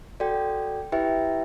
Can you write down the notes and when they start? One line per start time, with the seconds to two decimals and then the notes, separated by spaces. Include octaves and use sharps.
0.20 F#4 A4 D5 G5
0.92 E4 G4 B4 E5 G5